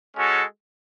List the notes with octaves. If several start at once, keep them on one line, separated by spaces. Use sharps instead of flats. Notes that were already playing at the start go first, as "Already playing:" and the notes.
G#3 C#4 F#4 A4